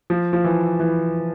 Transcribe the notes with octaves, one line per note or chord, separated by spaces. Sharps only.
F3
F3
E3
E3